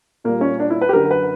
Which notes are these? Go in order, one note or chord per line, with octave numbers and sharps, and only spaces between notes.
A#2 G3 A#3
C#4
D4
E4
B4
G4
F#2 D3 F#3 A#4
B4